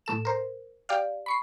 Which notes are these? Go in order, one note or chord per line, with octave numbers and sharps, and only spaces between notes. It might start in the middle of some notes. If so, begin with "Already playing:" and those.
A2 A4 E7
A#4 C5
G4 D5 F5
B5 C#6 C7